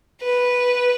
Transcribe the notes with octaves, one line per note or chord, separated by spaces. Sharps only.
B4